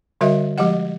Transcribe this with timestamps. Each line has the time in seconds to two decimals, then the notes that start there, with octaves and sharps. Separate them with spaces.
0.21 D3 G3 F#4 A#4 D#5 E5
0.58 F3 G#3 G4 D#5 F#5